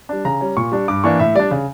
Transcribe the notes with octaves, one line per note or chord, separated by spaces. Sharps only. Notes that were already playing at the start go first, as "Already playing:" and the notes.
G3 D4
C#3 A#5
G3 C#4
A#2 C#6
G3 D4
G2 D6
E3 A#3 D4 C#6
A2 E5
G3 D4 D5
C#3